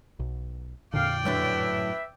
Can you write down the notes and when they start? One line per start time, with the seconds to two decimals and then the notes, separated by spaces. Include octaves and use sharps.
0.19 B1
0.94 F2 A#2 D3 D5 F5 G5
1.25 F#2 A2 D4 B4 E5